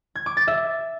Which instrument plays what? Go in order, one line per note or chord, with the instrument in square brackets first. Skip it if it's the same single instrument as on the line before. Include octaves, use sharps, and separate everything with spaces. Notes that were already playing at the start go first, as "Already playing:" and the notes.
[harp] G#6
D6
A6
E5